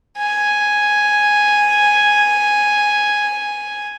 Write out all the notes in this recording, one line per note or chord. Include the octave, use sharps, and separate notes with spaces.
G#5